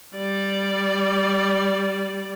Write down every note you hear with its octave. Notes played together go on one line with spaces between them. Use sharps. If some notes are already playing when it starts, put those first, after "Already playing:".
G3 D5